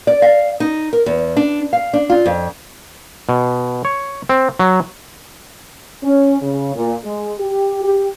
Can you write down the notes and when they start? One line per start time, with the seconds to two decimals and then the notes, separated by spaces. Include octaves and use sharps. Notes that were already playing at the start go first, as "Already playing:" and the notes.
0.07 D5
0.22 F5
0.60 D#4
0.93 A#4
1.06 E2
1.37 D4
1.73 F5
1.93 D4
2.10 F4
2.26 F2
3.29 B2
3.85 C#5
4.29 C4
4.59 F#3
6.03 C#4
6.42 C#3
6.75 A#2
7.04 G#3
7.39 G4
7.83 G4